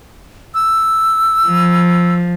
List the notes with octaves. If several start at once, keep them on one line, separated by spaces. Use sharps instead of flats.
E6
F3